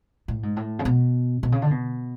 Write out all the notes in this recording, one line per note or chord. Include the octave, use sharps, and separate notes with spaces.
A2
G#2
A2
C#3
B2
B2
C#3
D3
B2